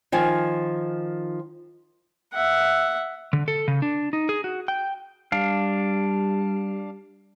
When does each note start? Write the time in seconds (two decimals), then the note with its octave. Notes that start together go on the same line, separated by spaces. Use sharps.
0.12 D#3 F3 G#5
2.34 E5 F#5
3.33 D3
3.48 A4
3.68 C#3
3.82 D4
4.13 D#4
4.29 G#4
4.44 F#4
4.68 G5
5.32 G3 D4 F5